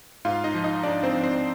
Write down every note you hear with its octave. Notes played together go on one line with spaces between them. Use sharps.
G#2 F4 F5
D#4 D#5
F3
D#4 D#5
G#2 D4 D5
C4 C5
F3
C4 C5